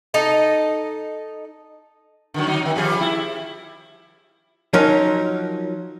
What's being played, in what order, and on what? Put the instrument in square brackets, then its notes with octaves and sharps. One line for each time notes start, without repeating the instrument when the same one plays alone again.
[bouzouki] D#4 A4 D#5
[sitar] D3 D#3 F#3
F#3 D#4
D3 D#3
F3 G3 G#4
E4
[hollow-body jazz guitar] F3 F#3 C#4 D#4 A#4